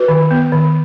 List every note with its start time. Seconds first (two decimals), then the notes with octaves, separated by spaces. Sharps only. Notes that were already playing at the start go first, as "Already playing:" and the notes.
Already playing: F#4 B4
0.08 D#3
0.31 B3
0.52 D#3